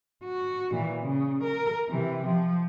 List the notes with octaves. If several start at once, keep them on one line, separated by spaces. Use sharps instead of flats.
F#4
A#2 E3
C#3
A#4
C3 E3
F3